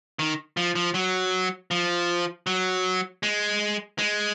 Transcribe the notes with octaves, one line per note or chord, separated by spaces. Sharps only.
D#3
F3
F3
F#3
F3
F#3
G#3
G#3